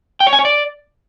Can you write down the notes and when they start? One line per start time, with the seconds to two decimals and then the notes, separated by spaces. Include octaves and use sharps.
0.20 G5
0.27 C#5
0.33 G#5
0.39 C#5
0.45 D5